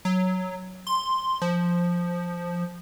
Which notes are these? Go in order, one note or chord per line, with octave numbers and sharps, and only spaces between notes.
F#3
C6
F3